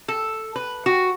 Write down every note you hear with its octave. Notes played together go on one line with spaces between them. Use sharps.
A4
B4
F#4